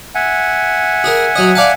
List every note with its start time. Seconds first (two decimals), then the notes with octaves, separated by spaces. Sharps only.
0.15 E5 F#5 G#5
1.04 G#4 A#4
1.36 F#3 D#5
1.55 D5 F5 A5